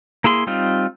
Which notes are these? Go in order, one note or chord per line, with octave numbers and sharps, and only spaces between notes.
A#3 E4 G#4 C6
G3 C4 D#4 F4